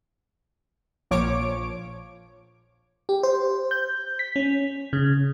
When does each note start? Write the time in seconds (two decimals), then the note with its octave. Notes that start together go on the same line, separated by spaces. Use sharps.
1.11 A#1 A#2 F3 C#5 D6 D7
3.09 G4
3.23 C5
3.71 G6
4.19 B6
4.36 C#4
4.93 C#3